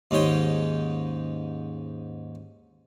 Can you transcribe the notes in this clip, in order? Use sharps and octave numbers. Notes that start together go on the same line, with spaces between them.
D#2 G#2 C#4 G5